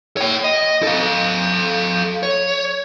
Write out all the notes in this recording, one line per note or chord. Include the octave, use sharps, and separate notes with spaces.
C#5 G5
D#5
A4 F5
C#5